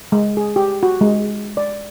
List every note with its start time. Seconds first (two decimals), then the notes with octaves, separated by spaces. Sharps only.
0.12 G#3
0.37 G#4
0.56 G4
0.83 F#4
1.01 G#3
1.57 D5